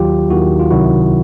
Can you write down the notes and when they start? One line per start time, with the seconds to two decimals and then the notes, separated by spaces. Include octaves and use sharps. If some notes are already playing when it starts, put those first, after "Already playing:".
Already playing: D#2 D#3 F#3 F4 G4
0.30 D#2 D#3 F#3 E4 F#4
0.60 F4
0.71 C#2 C3 D#3 F#3 E4 F#4